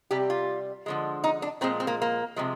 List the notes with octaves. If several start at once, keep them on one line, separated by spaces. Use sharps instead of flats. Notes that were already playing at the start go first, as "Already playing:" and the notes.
C3 G3 G4
F4
D3 F3 G#3
D#4
D4
A#2 F3 G#3 C4
C4
A#3
A#3
C3 F3 G#3